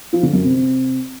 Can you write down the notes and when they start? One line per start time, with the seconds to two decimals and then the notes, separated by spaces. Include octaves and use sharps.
0.13 F3
0.23 D3
0.33 F#2
0.43 C3